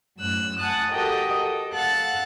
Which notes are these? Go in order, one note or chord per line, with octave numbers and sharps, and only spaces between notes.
F#2 A2 E6 F#6
F#5 G#5 A5 D#6 F#6
F#4 G4 A4 A#4 D#5 G5
A4
A4 F5 F#5 F#6 A6